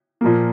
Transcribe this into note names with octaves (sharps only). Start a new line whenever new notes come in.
A#2 F3 A#3